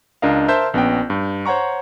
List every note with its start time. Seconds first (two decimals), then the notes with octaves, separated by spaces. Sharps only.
0.22 C#2 D4 A#4 D#5 F5
0.48 A#4 C5 E5 A5 C6 G6
0.74 A#1 B3 C#4 G5
1.10 G2
1.46 C5 C#5 F#5 A#5 C#6